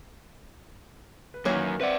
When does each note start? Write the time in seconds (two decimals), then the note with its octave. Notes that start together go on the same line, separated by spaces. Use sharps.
1.34 B4
1.45 F#2 D#3 E3 A#3 C#5 F5
1.81 C4 B4 D5 E5 F#5